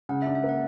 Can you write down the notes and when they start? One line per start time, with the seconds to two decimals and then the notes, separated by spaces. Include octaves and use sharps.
0.09 C#3 F#5
0.22 E5
0.26 D4
0.35 E5
0.44 A#3
0.49 F#5